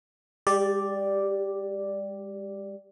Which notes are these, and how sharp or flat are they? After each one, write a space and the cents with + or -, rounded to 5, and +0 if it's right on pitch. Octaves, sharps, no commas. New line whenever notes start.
G#3 -45 G4 +0 D5 +0